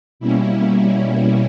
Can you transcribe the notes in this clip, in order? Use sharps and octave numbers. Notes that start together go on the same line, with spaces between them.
B2 G3 A#3 C#4 E4
E4